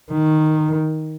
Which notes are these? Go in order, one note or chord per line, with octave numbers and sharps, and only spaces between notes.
D#3